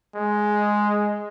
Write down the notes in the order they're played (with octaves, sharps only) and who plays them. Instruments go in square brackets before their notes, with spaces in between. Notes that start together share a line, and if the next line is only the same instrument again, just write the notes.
[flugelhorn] G#3